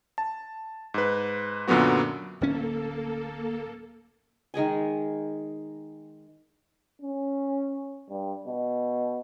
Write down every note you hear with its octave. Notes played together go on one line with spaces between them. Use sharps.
A5
G#2 B4
F#2 A#2 D3 F#3 B3 F#4
D1 A#3 C#4 A4
D#3 G#3 G#4 G#5
C#4
G2
B2